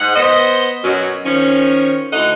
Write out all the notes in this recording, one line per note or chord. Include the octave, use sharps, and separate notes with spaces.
G#2 F#5
B3 C5 D#5
F#2 B2 F#3
D#3 F3 C#4
D2 D#4 E4 A4 F#5